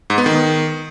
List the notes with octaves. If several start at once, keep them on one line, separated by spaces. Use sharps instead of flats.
G#2
B3
D#3